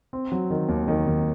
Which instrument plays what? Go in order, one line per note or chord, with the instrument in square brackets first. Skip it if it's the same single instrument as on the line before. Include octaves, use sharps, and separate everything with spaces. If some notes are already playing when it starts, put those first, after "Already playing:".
[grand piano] C4
F#3
D#3
D#2
D#3
D#2